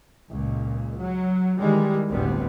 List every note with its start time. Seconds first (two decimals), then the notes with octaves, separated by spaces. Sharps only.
0.30 C#2 A#2
1.00 F#3
1.58 D#3 E3 G3 G#3
2.09 G1 D2 A2 G3 B3 C4